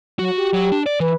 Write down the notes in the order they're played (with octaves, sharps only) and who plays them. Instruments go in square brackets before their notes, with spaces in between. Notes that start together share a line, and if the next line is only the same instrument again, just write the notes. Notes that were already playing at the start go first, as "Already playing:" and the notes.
[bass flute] F#3 [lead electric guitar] F#4
[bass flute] G4
[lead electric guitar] F#3
D4
D5
[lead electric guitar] E3 [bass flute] B4